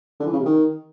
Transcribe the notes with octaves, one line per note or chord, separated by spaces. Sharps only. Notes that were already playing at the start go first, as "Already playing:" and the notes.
D3
E3
C#3
C3
D#3